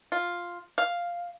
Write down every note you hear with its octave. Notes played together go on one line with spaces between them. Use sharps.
F4
F5